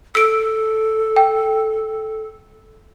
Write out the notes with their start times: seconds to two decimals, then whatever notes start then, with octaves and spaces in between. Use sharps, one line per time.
0.15 A4 E6 D7
1.16 G5